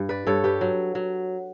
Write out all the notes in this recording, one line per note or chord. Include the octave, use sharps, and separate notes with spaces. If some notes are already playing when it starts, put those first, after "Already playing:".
Already playing: G2
B4 D5
G2 A4 C#5
G4 B4
F#3
F#3